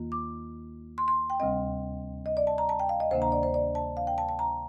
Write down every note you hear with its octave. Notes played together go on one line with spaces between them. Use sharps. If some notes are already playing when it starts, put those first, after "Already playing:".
Already playing: D#2 D#3 A#3 F4
D6
C6
C6
G5
D2 C3 G3 C4 D#5
D#5
D5
A5
A#5
A5
G5
F5
D#5
D2 C3 D#3 A#3 D4 C5
A#5
D5
C5
D5
A5
F5
G5
A5
A5
A#5